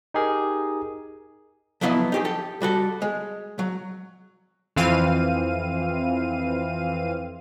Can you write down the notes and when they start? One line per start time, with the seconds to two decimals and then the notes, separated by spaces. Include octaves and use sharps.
0.14 D#4 G4 G#4 A#4
1.81 F3 F#3 B3 E4 D5 D#5
2.12 D#4 G4 G#4
2.25 G4 A4
2.62 G3 F#4 A4
3.02 G#3
3.59 F#3
4.76 F2 E3 C4 F5 D#7